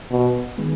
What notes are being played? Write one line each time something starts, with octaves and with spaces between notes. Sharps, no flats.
B2
D#3 G#3 B3